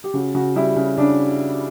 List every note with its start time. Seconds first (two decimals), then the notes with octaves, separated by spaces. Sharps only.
0.04 G4
0.14 C#3 F#4
0.34 C#3 F#4
0.56 G3 E4
0.76 C#3
0.98 C#3 D4